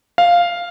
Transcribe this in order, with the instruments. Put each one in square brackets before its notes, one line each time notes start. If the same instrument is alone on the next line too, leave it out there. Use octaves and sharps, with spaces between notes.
[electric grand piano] F5